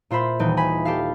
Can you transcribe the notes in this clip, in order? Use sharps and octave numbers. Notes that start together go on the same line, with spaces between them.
A#2 F4 C5 E5 B5
D#1 E3 D#4 G5
G#5 B5 B6
G4 A4 F5